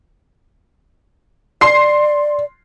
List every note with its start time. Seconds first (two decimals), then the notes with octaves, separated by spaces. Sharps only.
1.61 D5 C6 C7